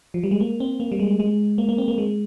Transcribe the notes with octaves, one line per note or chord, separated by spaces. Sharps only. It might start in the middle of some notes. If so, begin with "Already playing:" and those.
F3
G3
G#3
A#3
C4
A#3
G3
G#3
G#3
A#3
A#3
C4
A#3
G#3